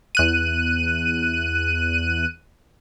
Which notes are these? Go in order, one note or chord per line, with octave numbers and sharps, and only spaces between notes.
E2 F#6 D#7